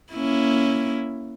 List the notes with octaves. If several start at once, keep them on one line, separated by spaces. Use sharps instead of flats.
A#3 C#4 E4